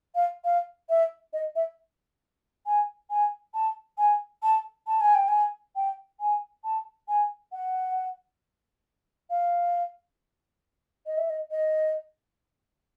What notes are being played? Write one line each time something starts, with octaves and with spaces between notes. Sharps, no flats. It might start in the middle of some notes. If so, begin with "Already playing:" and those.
F5
F5
E5
D#5
E5
G#5
G#5
A5
G#5
A5
A5
G#5
G5
G#5
G5
G#5
A5
G#5
F#5
F5
D#5
E5
D#5
D#5